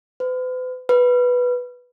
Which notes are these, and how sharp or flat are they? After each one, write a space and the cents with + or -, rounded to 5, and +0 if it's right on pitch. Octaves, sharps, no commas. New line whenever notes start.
B4 +45
B4 -5